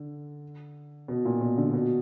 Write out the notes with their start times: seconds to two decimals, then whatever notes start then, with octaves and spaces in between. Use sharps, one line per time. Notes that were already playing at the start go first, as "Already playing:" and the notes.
Already playing: D3
1.08 B2
1.25 A#2
1.41 B2
1.58 D3
1.73 B2